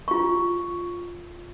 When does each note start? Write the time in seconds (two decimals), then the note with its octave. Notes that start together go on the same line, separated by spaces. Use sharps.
0.08 F4 C#6